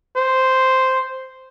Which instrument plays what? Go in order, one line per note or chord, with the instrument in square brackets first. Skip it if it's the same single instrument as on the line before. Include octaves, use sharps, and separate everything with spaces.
[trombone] C5